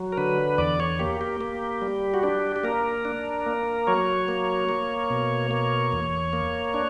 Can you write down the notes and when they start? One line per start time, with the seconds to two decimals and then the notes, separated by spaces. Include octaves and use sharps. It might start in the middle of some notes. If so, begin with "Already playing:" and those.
Already playing: F#3
0.12 A#4
0.17 D3 B4
0.58 E2 D5
0.80 C#5
0.99 A#3 G4
1.21 G4
1.41 A#3
1.82 G3
2.14 F#4
2.23 D4 G4
2.56 G4
2.63 A#3 A#4
3.05 D4
3.46 A#3
3.87 F#3 C#5
4.28 A#3
4.69 A#3
5.10 B2
5.51 A#3
5.92 E2
6.33 A#3
6.74 D4